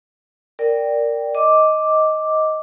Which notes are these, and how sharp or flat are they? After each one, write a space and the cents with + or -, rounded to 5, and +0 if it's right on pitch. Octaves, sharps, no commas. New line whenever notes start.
A#4 -10 D5 -5 G5 +0
D#5 +10 D6 +0